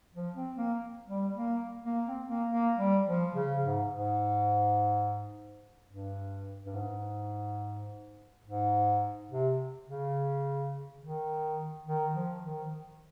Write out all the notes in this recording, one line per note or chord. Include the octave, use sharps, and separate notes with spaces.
F3
C4
A#3
G3
A#3
A#3
C4
A#3
A#3
G3
F3
C#3
G#2
G#2
G2
G2
G#2
G#2
C3
C#3
D#3
D#3
F3
D#3